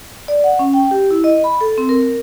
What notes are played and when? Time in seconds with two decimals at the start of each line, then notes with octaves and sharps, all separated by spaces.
0.28 D5
0.44 F#5
0.59 C#4
0.74 G5
0.91 G4
1.11 E4
1.24 D#5
1.44 B5
1.61 A4
1.78 C4
1.89 A#4